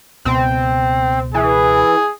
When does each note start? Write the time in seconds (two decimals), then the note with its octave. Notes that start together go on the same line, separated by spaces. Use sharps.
0.25 C#2 B2 C4
1.34 E3 G#4